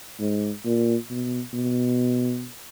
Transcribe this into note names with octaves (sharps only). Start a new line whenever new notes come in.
G#2
A#2
B2
B2